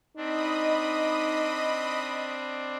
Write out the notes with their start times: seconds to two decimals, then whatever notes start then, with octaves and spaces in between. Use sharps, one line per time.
0.17 C4 D4 D#4 D#5 B5 D#6